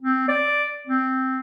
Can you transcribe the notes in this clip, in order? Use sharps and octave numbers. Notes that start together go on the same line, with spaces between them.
C4
D5
C4